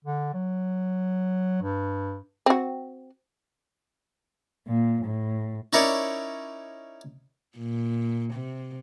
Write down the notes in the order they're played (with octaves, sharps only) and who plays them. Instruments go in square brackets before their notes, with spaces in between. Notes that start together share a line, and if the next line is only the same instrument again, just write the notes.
[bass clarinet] D3
F#3
G2
[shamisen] C4 F#4
[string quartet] A#2
A2
[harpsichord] C#4 D#4 E4 A#4 C#5 D5
[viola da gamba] A#2
C3